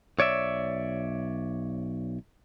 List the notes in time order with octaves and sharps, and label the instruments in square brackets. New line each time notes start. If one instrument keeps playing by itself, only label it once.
[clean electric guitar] B1 C#5 D5 E5